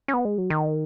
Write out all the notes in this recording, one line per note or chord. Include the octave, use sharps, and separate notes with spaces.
C#4
B3
G#3
F#3
D#3